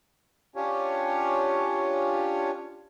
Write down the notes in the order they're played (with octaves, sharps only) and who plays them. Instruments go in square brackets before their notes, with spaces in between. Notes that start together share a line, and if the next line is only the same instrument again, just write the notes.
[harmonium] C#4 D4 F4 G4 C#5